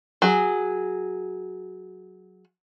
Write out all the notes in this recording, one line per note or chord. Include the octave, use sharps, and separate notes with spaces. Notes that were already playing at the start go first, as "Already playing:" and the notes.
F#3 G#4